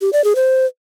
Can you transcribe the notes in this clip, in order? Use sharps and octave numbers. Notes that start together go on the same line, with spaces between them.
G4
D5
G#4
C5